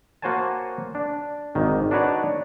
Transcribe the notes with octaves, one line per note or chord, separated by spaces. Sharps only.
A#3 F#4 C5 C#5 G#5 A5
D4
G#1 D#3
D4 D#4 F#4 B4 C#5 D5